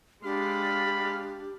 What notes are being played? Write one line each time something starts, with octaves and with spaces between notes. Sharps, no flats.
G#3 D4 G4 F5 B5